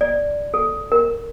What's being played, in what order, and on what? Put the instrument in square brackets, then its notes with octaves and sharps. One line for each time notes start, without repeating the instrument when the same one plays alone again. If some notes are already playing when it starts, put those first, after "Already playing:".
[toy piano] D5
A4
A#4